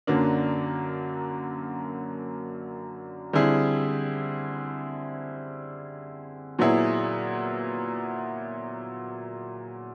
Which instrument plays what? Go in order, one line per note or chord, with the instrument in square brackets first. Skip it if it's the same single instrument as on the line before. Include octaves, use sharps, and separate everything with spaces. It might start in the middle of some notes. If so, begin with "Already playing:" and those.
[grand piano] F#2 D3 F#3 A#3 D4
D3 G3 C4 E4 G#4
A#2 F#3 B3 E4 G#4